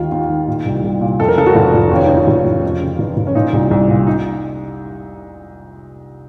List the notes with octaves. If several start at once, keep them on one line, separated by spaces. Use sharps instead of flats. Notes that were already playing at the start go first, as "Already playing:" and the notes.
Already playing: D#2 D#3 F4
D#2
D#3
A#2
C2
C2
A#2
F2 A4
A#4
C#3 A4
F#4
F1 F4
F1
D#2 C#4
C#3 D#4
F4
F1 F#4
F4
F1
F4
F2
C#3
F1
F1
C#4
A#2 D#4
C2
C2
A#2
D#4